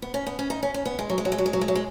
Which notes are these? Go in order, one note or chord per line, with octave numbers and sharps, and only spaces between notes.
B3
C#4
B3
C#4
D#4
C#4
C#4
B3
G#3
F#3
G#3
F#3
G#3
F#3
G#3
F#3
G#3
F#3
G#3